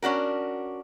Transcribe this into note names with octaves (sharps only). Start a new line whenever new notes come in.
C#4 D4 F#4 A#4